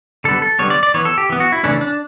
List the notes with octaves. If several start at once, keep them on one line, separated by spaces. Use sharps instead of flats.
D3 G3 B3 A4
A4
D3 G3 B3 C#5
D5
D5
E3 B3 C#5
A4
G4
E3 B3
F#4
E4
C#3 E3 A3 C#4 D4
D4